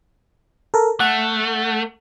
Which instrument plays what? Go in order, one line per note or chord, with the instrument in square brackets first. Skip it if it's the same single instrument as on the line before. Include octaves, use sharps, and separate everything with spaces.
[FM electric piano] A4 A#4
[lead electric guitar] A3 [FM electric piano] F#5